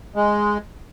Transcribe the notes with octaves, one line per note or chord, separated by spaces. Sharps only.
G#3